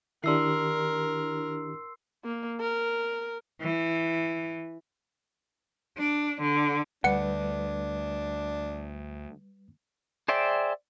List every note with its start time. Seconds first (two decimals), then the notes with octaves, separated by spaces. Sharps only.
0.24 D#3 D4 E4 G4 A#4 C6 E6 C7
2.24 A#3
2.61 A#4
3.61 E3
5.97 D4
6.40 D3
7.04 D2 G3 D4 B4 F#5 C#7
10.28 G#4 C5 D5 E5 G5